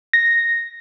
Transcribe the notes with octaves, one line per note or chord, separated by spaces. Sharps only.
A#6